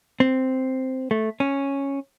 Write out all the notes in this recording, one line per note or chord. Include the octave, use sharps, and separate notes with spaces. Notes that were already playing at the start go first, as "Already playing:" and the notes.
C4
A3
C#4